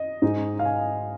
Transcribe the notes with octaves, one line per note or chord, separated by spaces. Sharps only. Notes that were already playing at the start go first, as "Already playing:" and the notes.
Already playing: D#5
G#2 G#3 D#4
F5
G#5